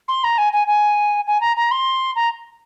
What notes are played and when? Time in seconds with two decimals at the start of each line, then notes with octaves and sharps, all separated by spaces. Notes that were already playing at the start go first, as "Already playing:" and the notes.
0.08 C6
0.24 A#5
0.38 G#5
0.53 G#5
0.67 G#5
1.27 G#5
1.41 A#5
1.57 A#5
1.71 C6
2.16 A#5